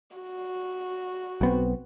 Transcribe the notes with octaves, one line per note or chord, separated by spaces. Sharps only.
F#4
B1 B3 C4